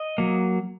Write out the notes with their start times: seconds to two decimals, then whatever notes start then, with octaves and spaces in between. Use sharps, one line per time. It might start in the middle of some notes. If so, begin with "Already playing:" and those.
Already playing: D#5
0.18 F#3 A#3